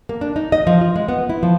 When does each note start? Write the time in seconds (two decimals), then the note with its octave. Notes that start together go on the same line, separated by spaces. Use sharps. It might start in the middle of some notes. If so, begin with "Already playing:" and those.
0.09 A#3
0.21 D4
0.36 D#4
0.52 D#5
0.67 F3
0.81 F4
0.96 G#3
1.08 B3
1.29 E4
1.43 F3